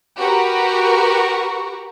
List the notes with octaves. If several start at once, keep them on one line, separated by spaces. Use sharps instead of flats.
F#4 G4 A#4 B4 A#5 C#6